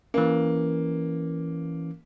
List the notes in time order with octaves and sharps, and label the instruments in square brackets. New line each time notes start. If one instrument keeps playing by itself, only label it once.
[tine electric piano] E3 C#4 [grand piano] A#3